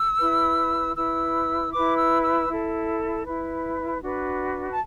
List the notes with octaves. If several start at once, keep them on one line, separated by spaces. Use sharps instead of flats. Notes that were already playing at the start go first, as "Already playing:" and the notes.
Already playing: E6
E4 B4
E4 B4 E6
E4 B4 D6
E6
E6
E4 A4
E4 B4
D4 F#4 B4
A5